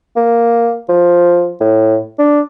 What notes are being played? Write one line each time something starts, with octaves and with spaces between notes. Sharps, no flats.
A#3
F3
A2
D4